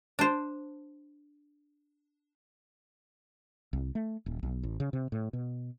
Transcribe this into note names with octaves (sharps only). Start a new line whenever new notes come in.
D4 C5
C2
A3
D#1
B1
A1
C#3
C3
A2
B2